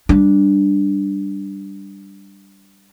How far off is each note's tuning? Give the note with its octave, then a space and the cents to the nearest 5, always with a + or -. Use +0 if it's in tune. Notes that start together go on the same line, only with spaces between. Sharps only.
G3 +0 D4 +0